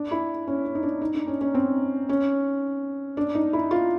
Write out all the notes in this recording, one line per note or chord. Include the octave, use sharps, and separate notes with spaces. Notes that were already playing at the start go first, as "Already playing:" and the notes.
Already playing: D4
E4
C#4
C#4
D#4
D4
D#4
D4
C#4
C#4
C4
C#4
D4
D#4
E4
F4